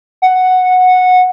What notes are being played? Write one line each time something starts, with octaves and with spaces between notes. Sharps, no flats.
F#5